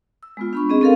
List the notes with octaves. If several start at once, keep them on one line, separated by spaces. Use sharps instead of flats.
E6
G#3 B3 F4
D4 B5 C#6
C4 C#4 G#4 D#5
C4 F4 A4 A#4 F5